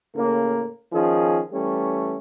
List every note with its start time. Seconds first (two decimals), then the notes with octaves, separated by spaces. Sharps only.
0.15 A2 C#3 A#3
0.92 D#3 F3 C#4 G#4
1.52 E3 G3 A3 C#4